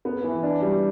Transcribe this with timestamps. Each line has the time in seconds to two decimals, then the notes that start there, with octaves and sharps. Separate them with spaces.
0.05 B3
0.24 E3
0.43 D4
0.62 G3